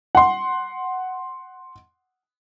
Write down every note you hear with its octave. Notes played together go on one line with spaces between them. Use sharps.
F#5 C6